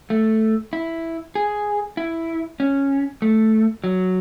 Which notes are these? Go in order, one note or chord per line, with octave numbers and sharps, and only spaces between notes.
A3
E4
G#4
E4
C#4
A3
F#3